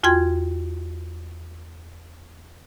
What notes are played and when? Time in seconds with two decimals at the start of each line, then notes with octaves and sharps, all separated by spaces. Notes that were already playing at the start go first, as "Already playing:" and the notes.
0.03 E2 F4 F#4 G5 C6 G#6